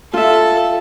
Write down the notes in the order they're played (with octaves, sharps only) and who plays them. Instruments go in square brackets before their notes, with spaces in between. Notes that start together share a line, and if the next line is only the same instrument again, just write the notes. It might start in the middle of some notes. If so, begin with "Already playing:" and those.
[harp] F4 E5 [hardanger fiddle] A4